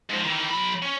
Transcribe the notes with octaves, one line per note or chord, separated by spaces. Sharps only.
G#2 F3
D#3 E3
F#3 B5
C#4